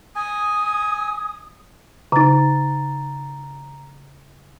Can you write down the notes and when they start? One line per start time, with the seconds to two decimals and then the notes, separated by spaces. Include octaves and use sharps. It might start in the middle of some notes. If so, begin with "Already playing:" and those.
0.16 G#5 D#6
2.12 C#3 D#4 A#5 A6